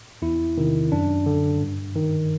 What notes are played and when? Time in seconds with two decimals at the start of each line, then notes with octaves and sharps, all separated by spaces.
0.22 E2 E4
0.58 C3 D#3
0.92 F#2 D4
1.26 D3
1.62 G2
1.96 D#3